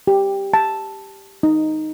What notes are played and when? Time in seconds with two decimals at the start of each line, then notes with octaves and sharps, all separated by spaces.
0.07 G4
0.54 A5
1.43 D#4